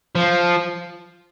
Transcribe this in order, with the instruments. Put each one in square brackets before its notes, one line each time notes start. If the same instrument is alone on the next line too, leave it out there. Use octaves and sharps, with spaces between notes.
[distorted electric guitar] F3